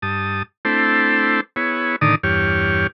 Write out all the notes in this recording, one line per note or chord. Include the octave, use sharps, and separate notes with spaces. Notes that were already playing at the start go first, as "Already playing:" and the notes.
G2 A5 D#6
A3 C4 D4 E4 A4 C5
B3 E4 G#4 C#5
A2 D3 D#3 D#4 D5 D#6
E2 G2 G4 C#5 F6